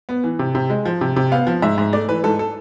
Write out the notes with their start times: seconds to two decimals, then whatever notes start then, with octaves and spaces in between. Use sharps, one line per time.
0.09 B3
0.24 E3
0.39 C3
0.55 C3
0.70 G#3
0.85 F3
1.01 C3
1.16 C3
1.32 B3 F5
1.47 F3
1.62 G#2 E5
1.78 G#2
1.93 A3 D5
2.08 E3 B4
2.24 G#2 A4
2.39 A4